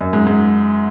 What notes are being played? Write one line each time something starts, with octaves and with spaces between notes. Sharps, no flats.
F#2
G#2
G#2